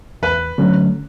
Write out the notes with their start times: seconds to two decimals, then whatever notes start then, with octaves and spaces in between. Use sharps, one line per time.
0.22 E2 B4
0.58 D3 F#3 A3 C#4